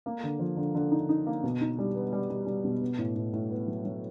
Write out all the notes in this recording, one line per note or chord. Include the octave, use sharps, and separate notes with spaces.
A#3
D3
F3
D3
D3
D#4
D#4
A#3
B2
D#4
G3
B3
G3
G3
G3
B2
B3
A2
A2
A2
B3
F#3
F#3